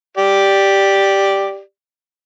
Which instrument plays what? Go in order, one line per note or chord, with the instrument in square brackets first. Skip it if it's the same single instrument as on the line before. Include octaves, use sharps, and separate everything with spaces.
[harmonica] G4 D5